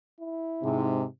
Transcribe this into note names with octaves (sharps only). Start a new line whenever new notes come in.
E4
G#2 C3